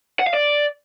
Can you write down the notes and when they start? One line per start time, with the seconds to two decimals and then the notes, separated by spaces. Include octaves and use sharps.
0.20 F#5
0.27 F5
0.34 D5